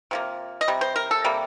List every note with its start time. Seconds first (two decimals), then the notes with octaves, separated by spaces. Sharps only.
0.11 C3 F3 A#3
0.61 D#5
0.68 C3 G3
0.81 C5
0.96 A#4
1.11 A4
1.24 C3 G3 A#3